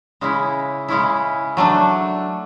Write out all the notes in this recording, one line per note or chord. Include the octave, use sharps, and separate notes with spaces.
C#3 G#3 C#4 E4
C#3 G#3 C#4 E4
F#3 A3 D4